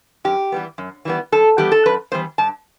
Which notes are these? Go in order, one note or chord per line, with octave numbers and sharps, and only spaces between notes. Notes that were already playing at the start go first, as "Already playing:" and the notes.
F#2 G4
E3 G3 B3
F#2
E3 G3 B3
F#2 A4
E3 G3 B3 G4
A4
F#2 B4
E3 G3 B3 C5
G2 A5